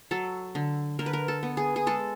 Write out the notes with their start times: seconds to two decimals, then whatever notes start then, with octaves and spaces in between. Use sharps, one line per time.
0.11 F#3 A4
0.55 D3
0.99 D3 A#4
1.06 B4
1.13 A#4
1.28 A4
1.43 B3
1.57 G#4
1.76 G#4
1.87 G#3 A4